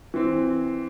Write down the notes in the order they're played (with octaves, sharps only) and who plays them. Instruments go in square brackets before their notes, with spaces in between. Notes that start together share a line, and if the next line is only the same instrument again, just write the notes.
[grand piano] E3 C4